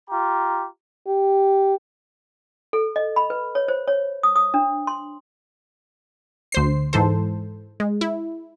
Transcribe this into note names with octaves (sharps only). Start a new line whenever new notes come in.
F4 G4 A#5
G4
A4
D#5
B5
B4
C#5
C5
C#5
D#6
D#6
D4
C6
D2 C5 C7
G#2 E3 A4 C5
G#3
E4